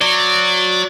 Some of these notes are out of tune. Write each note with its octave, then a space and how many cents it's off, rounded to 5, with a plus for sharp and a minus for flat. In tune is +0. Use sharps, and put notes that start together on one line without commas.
F#3 -15 D5 -5